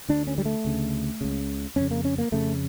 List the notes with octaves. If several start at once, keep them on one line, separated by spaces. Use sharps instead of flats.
D2 D3 D4
C#4
G3
A3
D2 C#3
C#2 C#3
F2 C#3 C#4
A#3
C#4
A#3
F2 C#3 A3